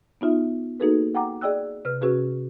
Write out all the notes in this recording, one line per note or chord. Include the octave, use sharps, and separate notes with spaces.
B3 D#4 F4 E5
A#3 D#4 F#4 G#4 A4 B4
F#5 G5 A#5 D6
G#4 D5 D#5 G5 E6 F#6
C3 B4 F6
C3 C#4 F#4 G#4 B4